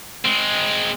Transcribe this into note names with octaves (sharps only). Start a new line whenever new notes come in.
G#3 C4